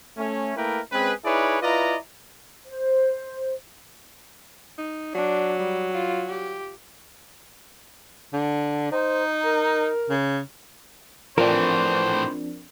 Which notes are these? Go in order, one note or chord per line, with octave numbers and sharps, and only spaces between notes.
A3 C#4
A3 A#3 E4 A#4 B4 G5
G#3 C4 C#4 G#4 B4
D#4 E4 G#4 B4 C#5 D5
E4 F4 B4 D5 D#5 A#5
C5
D#4
F#3 D4
G3
F4
G4
D3
D#4 C5
A#4
C#3
A2 E3 F3 C4 D4 A#4 C5